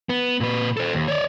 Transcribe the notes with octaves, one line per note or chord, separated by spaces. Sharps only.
B3
A#2 B4
A4 C5
D#2
C#5 D5